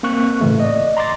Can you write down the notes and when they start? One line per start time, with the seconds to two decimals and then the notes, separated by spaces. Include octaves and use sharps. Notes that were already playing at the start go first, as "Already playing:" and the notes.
0.03 A#3 C4 C#6 F#6
0.41 A2 C#3 E3 A3
0.60 D5 D#5
0.97 A#5 C6 D6 A6